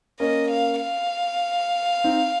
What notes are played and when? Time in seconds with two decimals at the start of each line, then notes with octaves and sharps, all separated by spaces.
0.19 A#3 C#4 D#5
0.51 F5
0.81 F5
2.04 C4 D#4